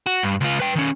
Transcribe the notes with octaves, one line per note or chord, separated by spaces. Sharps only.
F#4
G2
C#2 F4
B4 G5
D#3 C#4